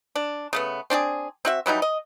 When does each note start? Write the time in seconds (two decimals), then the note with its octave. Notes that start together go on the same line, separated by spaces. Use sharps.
0.15 D4
0.53 C#3 A3 B3
0.90 C4 D4 F#4 G#4
1.45 C4 F#4 E5
1.66 E3 F#3 G3 D#4
1.82 D#5